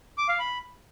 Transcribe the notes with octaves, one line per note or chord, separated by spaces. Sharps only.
D6
F5
B5